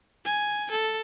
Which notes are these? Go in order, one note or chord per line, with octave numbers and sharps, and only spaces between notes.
G#5
A4